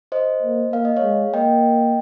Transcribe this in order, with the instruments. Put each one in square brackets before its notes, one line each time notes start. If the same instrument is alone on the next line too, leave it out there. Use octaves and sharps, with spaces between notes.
[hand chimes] C5 D#5
[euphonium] A#3
[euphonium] A#3 [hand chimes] F5
[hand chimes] D#5
C#5 F5
[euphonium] G#3
[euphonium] A#3 [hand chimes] D#5 G5